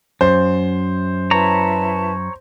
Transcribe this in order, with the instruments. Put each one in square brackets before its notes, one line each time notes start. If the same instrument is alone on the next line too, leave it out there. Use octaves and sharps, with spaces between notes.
[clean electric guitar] F#2 [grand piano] C5
[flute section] E4 B4 A5 [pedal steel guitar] C#5 A#5